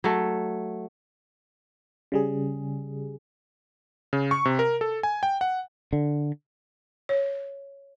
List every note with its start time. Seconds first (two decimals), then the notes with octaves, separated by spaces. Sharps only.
0.04 F#3 A3
2.12 C#3 G3 G#4
4.13 C#3
4.31 C#6
4.45 C3
4.59 A#4
4.81 A4
5.03 G#5
5.23 G5
5.41 F#5
5.93 D3
7.09 C#5